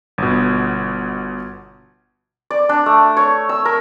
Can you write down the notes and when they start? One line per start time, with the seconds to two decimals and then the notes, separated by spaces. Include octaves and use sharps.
0.18 G1 B2
2.51 D5
2.69 D4
2.86 A3
3.17 C#5
3.49 E6
3.65 A#4